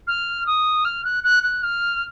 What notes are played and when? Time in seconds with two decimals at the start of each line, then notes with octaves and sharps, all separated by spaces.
0.07 F6
0.47 D#6
0.85 F6
1.05 F#6
1.24 F#6
1.43 F#6
1.63 F6